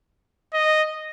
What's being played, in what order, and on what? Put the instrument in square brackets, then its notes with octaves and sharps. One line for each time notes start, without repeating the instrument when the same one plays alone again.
[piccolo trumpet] D#5